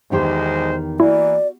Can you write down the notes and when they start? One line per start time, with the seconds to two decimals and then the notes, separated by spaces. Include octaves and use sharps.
0.11 B1 E2 D#3 G#3 G4 C5
1.00 E3 A#3 E4 F#4 D5